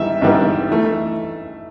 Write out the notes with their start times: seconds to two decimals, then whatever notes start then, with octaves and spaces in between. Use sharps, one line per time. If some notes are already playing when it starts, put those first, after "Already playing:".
Already playing: G#1 G2 E3 G3 B3 E5
0.21 G#1 G2 E3 G3 B3
0.71 E3 A3